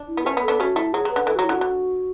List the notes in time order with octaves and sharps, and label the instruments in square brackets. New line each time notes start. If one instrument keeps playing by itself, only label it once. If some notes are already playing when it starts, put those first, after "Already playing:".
Already playing: [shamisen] D4
[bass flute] E4
[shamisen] B3
[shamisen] A3 C#4 [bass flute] B4
[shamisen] B3
[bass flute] A4
[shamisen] B3 D4
[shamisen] A3 C#4 [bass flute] F#4
[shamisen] A3 [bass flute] E4
[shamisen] F#3 [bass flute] G#4
[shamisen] F#3
[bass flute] B4
[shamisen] D3
[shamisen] E3 [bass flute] A4
[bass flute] F#4
[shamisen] F#3
[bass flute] E4
[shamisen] D3
[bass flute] F#4
[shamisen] D3